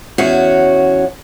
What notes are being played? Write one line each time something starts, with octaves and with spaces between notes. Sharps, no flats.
E2 C#4 F#4